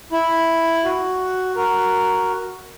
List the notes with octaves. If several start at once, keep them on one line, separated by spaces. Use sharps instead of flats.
E4
F#4
F#4 A#4